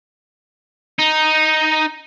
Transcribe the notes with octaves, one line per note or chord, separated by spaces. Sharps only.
D#4